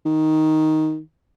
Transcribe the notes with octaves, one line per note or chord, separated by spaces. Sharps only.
D#3